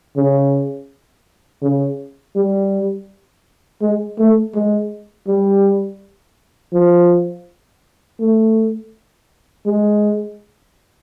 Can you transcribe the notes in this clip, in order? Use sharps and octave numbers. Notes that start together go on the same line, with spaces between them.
C#3
C#3
G3
G#3
A3
G#3
G3
F3
A3
G#3